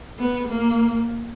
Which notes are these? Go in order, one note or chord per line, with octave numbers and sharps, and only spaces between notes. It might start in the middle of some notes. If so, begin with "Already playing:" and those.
B3
A#3